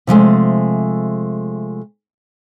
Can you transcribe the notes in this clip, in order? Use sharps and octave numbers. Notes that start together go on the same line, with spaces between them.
C3 F3 G#3 A3